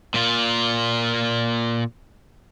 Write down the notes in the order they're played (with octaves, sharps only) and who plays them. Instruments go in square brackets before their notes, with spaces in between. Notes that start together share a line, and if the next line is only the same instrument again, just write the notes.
[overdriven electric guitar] A#2 F4